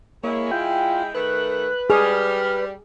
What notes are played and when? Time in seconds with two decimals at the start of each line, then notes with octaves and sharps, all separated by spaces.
0.24 G#3 A#3 E4 C#5
0.51 F4 G5
1.15 D#3 A3 B4 F#6
1.90 G3 G#4 F6